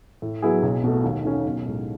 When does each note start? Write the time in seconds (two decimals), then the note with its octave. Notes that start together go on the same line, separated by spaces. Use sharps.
0.22 A2
0.42 F#3 B3 E4 G#4
0.63 B1
0.84 B2 A3
1.04 D#2
1.25 D#3 A3 C#4
1.45 B1
1.66 A2 G#3